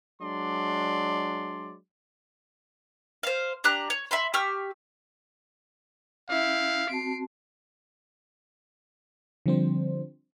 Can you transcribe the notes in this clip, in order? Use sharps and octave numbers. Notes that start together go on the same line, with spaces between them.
F#3 G#3 D4 D5 C6
C5 F5
D4 G4 A#5 F#6
C#5
E5 B5 C6
G4 C#6 E6 F6
C#4 E4 E5 F5 G5
C4 F#4 A5 C7 D7
D3 F3 G3 C4 D4 C5